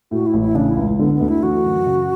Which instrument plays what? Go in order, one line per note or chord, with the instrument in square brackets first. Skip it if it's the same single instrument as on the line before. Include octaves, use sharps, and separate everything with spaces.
[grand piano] A2 [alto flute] F#4
[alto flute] E4
[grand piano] A1
[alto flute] E4
[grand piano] C#3 [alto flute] D4
[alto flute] E4
[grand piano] C#2
[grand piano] D3 [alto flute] B3
[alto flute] B3
[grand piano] D2
[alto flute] E4
[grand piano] E3 [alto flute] F#4
[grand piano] F#2
C#3